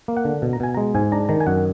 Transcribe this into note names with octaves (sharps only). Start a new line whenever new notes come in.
A#3
F#5
D3
B2
A#5
B2 G#5
G#3 A#5
G#2 G#5
D4 A#5
D#3 A#5
G#5
F#2 F#5